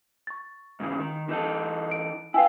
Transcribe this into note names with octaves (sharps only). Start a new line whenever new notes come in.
C#6 A6
G#2 C#3 E3
D#3
E3 D#4 A4
D7
E4 B4 F5 G5 G#5